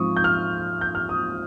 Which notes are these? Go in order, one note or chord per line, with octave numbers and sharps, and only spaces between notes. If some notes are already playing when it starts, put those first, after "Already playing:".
Already playing: G#2 F3 C4 C#6 D#6
G6
F6
G6
F6
D#6